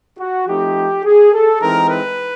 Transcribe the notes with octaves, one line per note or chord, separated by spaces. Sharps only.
F#4
F3 A3 C4 D#4 G4
G#4
A4
E3 G#3 C4 D#4 A#4
B4